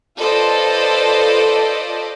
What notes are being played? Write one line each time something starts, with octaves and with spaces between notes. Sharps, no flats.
F4 A4 B4 C5 D5 D#5